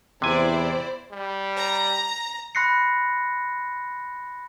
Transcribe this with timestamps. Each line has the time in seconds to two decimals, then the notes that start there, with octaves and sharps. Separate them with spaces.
0.22 E2 C3 E4 C5 D5 G#5
1.12 G3
1.56 A#5
2.55 B5 C6 F#6 A#6 C7 C#7